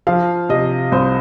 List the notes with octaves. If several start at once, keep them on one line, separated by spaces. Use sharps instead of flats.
F3 F5
C3 D#5
C2 C5